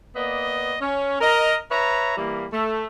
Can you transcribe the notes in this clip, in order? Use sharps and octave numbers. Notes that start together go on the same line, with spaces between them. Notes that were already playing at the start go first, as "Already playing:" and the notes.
A#3 B3 D5 D#5
C#4
A#4 D#5
B4 C#5 E5 A#5
E3 G3 A#3
A3